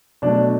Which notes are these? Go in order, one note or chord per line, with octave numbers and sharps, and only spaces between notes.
B2 F#3 A3 D4